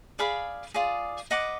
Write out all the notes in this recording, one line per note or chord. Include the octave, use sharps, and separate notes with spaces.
G#4 D5 F5 B5
F4 G#4 D5
B4 D#5 F#5 D6